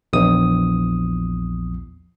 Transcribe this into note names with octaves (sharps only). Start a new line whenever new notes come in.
A#1 E2 D#6